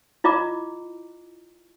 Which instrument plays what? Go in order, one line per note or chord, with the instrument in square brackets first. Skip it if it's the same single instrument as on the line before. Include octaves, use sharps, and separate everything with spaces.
[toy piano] E4 F4 D#5 A#5 D6